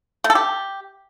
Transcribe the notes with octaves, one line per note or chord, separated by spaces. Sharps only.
A3
A4
G4